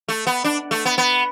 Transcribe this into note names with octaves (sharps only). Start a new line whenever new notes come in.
A3
B3
D4
A3
B3
B3